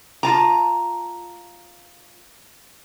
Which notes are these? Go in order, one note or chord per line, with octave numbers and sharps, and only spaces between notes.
F4 A5 A#5